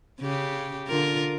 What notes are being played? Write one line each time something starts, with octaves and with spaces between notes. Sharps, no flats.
C#3 G4
D3 F4 A#4